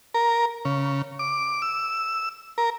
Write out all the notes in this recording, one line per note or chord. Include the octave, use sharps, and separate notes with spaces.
A#4
C#3
D6
E6
A#4